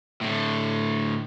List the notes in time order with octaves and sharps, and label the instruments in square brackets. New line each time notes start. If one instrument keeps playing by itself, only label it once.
[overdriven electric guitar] A2 D3